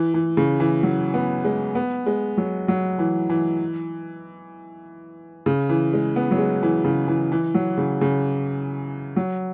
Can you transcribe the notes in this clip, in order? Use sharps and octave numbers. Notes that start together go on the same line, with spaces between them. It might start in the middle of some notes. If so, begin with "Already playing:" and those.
Already playing: E3
E3
C#3
E3
F#3
B3
G#3
B3
G#3
F#3
F#3
E3
E3
C#3
E3
G#3
B3
F#3
G#3
E3
C#3
E3
E3
F#3
C#3
C#3
F#3